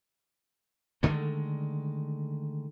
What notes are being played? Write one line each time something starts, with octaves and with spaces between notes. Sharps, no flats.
D3 D#3 G#3 A3